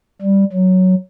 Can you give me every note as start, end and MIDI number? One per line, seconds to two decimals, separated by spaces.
0.22 0.44 55
0.53 0.95 54